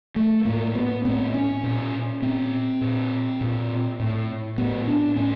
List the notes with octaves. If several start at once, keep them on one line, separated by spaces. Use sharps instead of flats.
A3
A2 A#3
B3
A2 C4
C#4
A#2
A#2 C4
A#2
A#2
A2
A2 B3
D4
A2 C#4